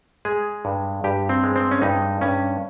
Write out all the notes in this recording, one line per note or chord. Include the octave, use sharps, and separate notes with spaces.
G#3 G#4
G2
G2 G4
C4
G#3
C4
C#4
G2 D#4
G2 C#4